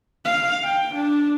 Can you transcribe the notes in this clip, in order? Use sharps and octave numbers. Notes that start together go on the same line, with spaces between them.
F5
G5
D4